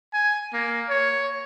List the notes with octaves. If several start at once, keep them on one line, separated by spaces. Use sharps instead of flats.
G#5
A#3
C#5